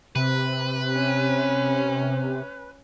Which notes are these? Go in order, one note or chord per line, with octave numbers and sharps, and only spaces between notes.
C3 C4 B4
C#4